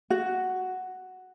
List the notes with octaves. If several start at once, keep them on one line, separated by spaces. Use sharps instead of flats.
F#4